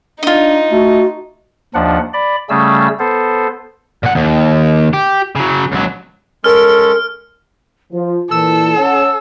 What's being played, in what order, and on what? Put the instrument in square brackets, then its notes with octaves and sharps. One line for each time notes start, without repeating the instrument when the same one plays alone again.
[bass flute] D4 [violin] D#4 [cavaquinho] F4 D#5
[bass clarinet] A3 [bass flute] F#4
[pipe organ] D#2 F3 D4 F#5
D5 B5
C#3 G3 A3 C#4 G#4 E6
B3 A4 C5
[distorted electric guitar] A#2 F#5
D#2
G4
C#3 F#3
C#2 F#3
[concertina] G#3 C#4 A4 [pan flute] A#4 [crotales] F6
[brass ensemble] F3 [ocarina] F4
[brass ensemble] A#2 E3 [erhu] A4 [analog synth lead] E6
[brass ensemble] C#4 F#5 [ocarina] C#5